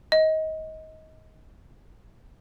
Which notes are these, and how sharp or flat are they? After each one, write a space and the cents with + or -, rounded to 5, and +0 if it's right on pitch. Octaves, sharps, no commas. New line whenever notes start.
D#5 +25